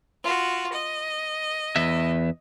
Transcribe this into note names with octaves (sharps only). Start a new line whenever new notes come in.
F4 F#4
D#5
E2 E5